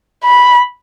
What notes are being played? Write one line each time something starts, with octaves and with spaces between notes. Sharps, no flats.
B5